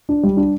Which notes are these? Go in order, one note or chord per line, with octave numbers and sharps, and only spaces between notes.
D4
G3
D4